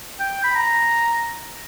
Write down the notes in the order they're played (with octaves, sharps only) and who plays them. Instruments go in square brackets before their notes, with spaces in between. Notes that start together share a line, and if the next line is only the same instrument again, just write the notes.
[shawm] G5
B5
A#5